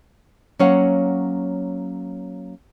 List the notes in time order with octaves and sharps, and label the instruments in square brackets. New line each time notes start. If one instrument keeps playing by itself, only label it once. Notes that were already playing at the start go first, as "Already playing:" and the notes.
[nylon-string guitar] F#3 A#3 C#4 C#5 F5 F#5